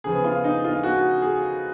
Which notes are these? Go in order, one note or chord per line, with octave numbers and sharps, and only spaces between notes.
C#3 F3 B3 G#4
F4
D#4
F4
F#4
G#4